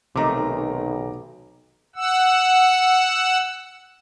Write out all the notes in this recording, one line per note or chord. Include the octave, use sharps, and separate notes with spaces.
B1 C3 D#3 A3 D#5 A#5 D6
F#5 E6